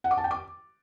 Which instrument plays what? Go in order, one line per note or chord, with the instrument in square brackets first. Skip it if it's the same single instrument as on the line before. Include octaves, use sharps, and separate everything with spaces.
[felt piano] F#5
D6
A5
G5
D6